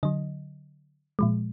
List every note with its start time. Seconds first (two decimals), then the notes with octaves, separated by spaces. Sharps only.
0.03 D3 F#3 D#5
1.19 A#2 F3 G#3